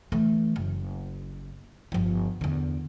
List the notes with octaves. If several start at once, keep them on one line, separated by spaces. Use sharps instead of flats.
E3 A3
F#1
G1 F3
E2 D3